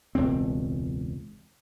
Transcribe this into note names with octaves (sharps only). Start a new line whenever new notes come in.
E1 C#2 G2 C4